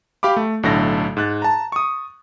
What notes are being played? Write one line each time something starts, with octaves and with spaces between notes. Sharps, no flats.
G4 F5 B5 D6
A3
B1 A2 D3 A4 A#6
G#2 F#6 A6
A5 A#5
C#6 D#6